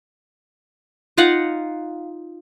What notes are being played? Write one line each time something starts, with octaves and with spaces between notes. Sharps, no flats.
D#4 F4 F5 F#5